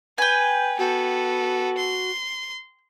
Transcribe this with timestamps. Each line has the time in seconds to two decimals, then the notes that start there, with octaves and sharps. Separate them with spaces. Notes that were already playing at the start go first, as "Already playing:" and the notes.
0.18 B4 G5 G#5
0.78 B3 F#4 A4
1.77 C6